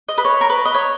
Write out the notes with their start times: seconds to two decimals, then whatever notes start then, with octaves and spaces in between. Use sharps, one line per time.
0.09 D#5
0.18 B4
0.25 C#5
0.41 A#4
0.50 B4
0.65 D#5
0.75 C#5